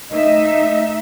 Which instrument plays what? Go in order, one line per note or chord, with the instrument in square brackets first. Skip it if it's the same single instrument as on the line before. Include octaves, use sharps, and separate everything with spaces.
[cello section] A3 D#4 E5 [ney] D#5